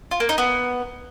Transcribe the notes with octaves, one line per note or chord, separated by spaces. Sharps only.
F4
A#3
D#4
B3